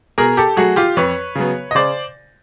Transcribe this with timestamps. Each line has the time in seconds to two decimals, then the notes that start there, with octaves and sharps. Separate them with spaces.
0.18 B2 G#4 A#4
0.37 G4 A4
0.57 F#3 A3 F#4 G#4
0.76 F4 G4
0.97 F2 B4 C#5
1.35 C#3 F#3 B3
1.71 D#5
1.75 C#3 C5 D5